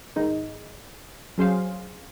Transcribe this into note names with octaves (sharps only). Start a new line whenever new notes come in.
G#2 D#3 G#3 D#4
F#3 C#4 G#4 C5 F5